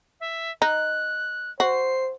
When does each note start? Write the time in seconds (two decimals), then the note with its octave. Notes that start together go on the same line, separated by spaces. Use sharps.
0.20 E5
0.62 D#4 F#6
1.60 F#4 C5 C7